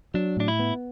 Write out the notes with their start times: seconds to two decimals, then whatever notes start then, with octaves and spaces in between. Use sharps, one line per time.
0.14 F#3 D4
0.37 A2 D4
0.48 E4
0.59 B3